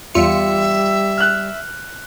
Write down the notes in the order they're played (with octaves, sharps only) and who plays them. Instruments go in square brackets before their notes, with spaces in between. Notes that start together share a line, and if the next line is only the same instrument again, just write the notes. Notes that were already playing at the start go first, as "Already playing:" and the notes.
[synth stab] E2 F4 C#7 [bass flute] G3 [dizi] E5
[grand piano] F6 F#6